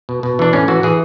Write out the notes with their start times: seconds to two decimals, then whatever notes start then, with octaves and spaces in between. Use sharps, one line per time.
0.09 B2
0.23 B2
0.39 E3 D4
0.53 A2 C#4
0.68 E3 F#4
0.83 E3 G#4